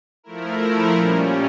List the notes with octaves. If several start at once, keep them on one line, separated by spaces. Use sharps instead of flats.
F3 A3 E4 A#4
A#2 G3 C#4